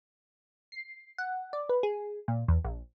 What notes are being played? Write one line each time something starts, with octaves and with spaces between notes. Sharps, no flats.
C7
F#5
D5
B4
G#4
A#2
E2
A#1